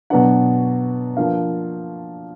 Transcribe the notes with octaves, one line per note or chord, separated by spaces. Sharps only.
B2 F#3 B3 D4 F#5
F3 A#3 D4 F5